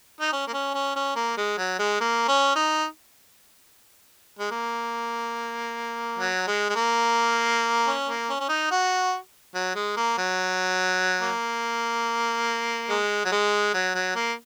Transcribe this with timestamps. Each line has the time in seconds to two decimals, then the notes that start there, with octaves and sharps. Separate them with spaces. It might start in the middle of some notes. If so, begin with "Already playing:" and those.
0.20 D#4
0.33 C#4
0.47 A#3
0.53 C#4
0.74 C#4
0.96 C#4
1.16 A#3
1.37 G#3
1.58 F#3
1.79 G#3
2.00 A#3
2.28 C#4
2.55 D#4
4.39 G#3
4.51 A#3
6.19 F#3
6.47 G#3
6.69 G#3
6.76 A#3
7.87 C#4
8.08 A#3
8.29 C#4
8.40 C#4
8.49 D#4
8.71 F#4
9.55 F#3
9.75 G#3
9.97 A#3
10.18 F#3
11.22 A#3
12.90 G#3
13.25 F#3
13.32 G#3
13.74 F#3
13.95 F#3
14.15 A#3